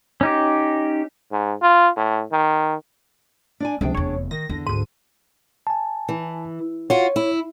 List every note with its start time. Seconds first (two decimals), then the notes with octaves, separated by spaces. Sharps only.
0.21 C#4 D#4 G4
1.32 G#2
1.62 F4
1.97 A2
2.32 D#3
3.60 D4 D5 G#5
3.81 C#2 C3 F3 D4 G#4 G5
3.94 F1 E2 C#5
4.31 D#3 A#6
4.49 E2 D3
4.67 D2 G#2 D#7
5.67 G#5 A5
6.09 E3
6.90 F4 F#4 C#5
7.16 E4